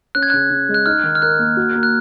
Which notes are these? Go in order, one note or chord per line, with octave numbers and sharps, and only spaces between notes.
C#4 F#6
G#6
C#3 F#6
C#3
G#3
F#6
D#4 F6
D#3
F6
A#4 F#6
A#3
F#4
A#3
F#6